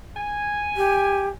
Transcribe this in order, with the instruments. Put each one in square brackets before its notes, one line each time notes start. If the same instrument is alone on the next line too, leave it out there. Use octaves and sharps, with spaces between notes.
[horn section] G#5
[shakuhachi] G4